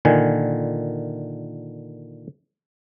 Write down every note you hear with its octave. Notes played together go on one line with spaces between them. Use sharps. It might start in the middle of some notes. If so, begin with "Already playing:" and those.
A#2 D3 D#3 G#5